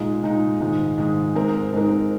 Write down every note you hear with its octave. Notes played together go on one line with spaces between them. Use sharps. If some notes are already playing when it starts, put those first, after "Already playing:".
Already playing: A#2 G#3 D#4
A#2 G#3 D#4
G#2 D#3 G#3
G#2 D#3 G#3
G#2 G#3 C4 D#4 A#4
G#2 G#3 C4 D#4 A#4